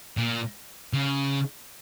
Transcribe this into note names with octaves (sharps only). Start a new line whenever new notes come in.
A#2
C#3